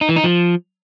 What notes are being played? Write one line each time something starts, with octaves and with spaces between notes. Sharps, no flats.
D#4
E3
D#4
F3